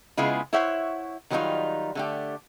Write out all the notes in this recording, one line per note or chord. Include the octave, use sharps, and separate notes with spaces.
C#3 G#3 B3 E4 F4 G#4
E4 C5 C#5 E5 F#5
D#3 F#3 G3 D4 D#4 F4
D3 A3 G4